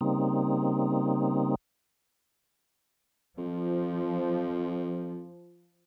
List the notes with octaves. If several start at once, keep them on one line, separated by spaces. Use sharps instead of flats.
C#3 G3 A#3 C4 D#4
F2 F3